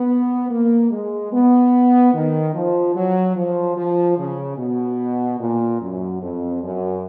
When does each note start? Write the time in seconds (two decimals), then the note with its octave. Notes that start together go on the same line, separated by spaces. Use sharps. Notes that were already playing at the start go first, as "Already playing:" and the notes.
Already playing: B3
0.50 A#3
0.90 G#3
1.32 B3
2.13 D#3
2.53 F3
2.94 F#3
3.36 F3
3.76 F3
4.17 C#3
4.57 B2
5.39 A#2
5.80 F#2
6.21 F2
6.62 F#2